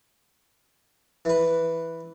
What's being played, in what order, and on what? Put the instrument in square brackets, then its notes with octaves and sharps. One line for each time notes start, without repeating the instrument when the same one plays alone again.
[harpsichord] E3 B4